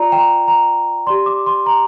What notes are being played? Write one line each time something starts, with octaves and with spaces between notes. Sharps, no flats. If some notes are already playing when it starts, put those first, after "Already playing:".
Already playing: F4 D5 A#5
G5
A#5
A#5
G4 D5 C6
D6
C6
A#5